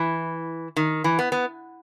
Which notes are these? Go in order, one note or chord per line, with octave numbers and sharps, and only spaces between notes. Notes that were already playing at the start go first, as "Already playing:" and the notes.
Already playing: E3
D#3
E3
B3
B3